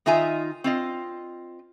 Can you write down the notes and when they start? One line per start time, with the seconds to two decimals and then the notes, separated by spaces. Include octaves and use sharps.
0.06 D#3 D#4 F4 E5 G#5 A#5
0.64 C4 F4 D#5